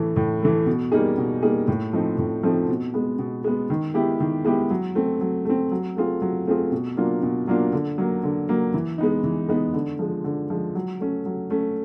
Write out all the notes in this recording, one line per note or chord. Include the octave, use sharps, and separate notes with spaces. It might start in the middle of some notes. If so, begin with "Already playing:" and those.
Already playing: A2 E3 A3
A2
E3 A3
B2
G3 A#3 D#4 G#4
B2
G3 A#3 D#4 G#4
A2
F3 A3 C4 D#4
A2
F3 A3 C4 D#4
B2
G#3 B3
B2
G#3 B3
D#3
G#3 B3 E4 G4
D#3
G#3 B3 E4 G4
F#3
A3 C4
F#3
A3 C4
F#3
A3 C4 F4 G#4
F#3
A3 C4 F4 G#4
B2
F#3 A#3 D4 F4
B2
F#3 A#3 D4 F4
D3
F#3 A#3
D3
F#3 A#3
E3
G#3 B3 D#4
E3
G#3 B3 D#4
D3
F3 G#3
D3
F3 G#3
F#3
A3 C#4
F#3
A3 C#4